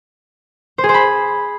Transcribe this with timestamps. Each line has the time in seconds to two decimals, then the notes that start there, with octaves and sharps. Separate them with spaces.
0.78 C5
0.84 G#4
0.89 C5
0.94 B5